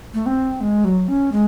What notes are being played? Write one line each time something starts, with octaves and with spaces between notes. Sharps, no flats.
A3
C4
G#3
F#3
C#4
G#3